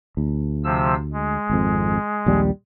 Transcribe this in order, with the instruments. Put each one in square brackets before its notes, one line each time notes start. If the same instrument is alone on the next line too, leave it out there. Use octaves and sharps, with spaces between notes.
[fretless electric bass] D2
[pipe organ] C3 F3 E6
G#3
[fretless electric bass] G#1 F2
A#1 D#2 G3